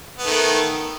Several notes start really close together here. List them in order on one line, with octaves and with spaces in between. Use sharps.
B3 A3 D#3